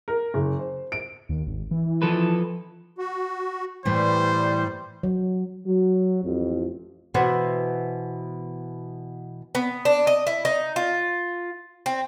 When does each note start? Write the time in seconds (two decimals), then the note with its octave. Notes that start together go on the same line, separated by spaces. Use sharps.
0.08 A#4
0.34 F#1
0.59 C5
0.92 D7
1.29 D#2
1.47 G#1
1.71 E3
2.02 F3 A4 B4
2.98 F#4
3.85 A2 E3 G3 C5
5.03 F#3
5.66 F#3
6.23 A1 F2
7.14 B2 E3 B3 C5 E5 F#5
9.55 B3
9.85 D4
10.07 D#5
10.27 E4
10.45 D#4
10.76 F4
11.86 C4